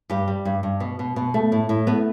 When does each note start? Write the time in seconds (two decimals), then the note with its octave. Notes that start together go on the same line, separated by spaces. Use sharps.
0.10 G2 G4
0.28 G3
0.45 G2
0.63 G2
0.80 B2
0.99 B2
1.16 B2
1.34 A3
1.52 A2
1.69 A2
1.87 A3 B3